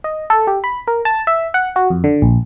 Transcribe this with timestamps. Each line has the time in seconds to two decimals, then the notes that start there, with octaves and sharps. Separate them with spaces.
0.04 D#5
0.30 A4
0.47 G4
0.64 B5
0.88 A#4
1.05 A5
1.27 E5
1.54 F#5
1.76 F#4
1.90 F2
2.04 D3
2.22 A#1